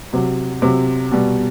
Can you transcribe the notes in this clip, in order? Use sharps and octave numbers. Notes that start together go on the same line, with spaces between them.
C3 F#3
C3 F#3
B2 G3